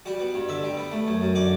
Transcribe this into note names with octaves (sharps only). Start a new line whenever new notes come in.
G3 F#4
B3
G2
D3 E5
G3
B3
A3
F#2
F#2
D3 D5